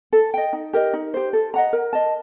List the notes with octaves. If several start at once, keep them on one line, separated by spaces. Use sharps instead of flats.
A4
D#5 G5
D#4
G4 A#4 D#5
D#4
G4 C5
A4
D#5 F#5 A#5
A#4
D#5 A5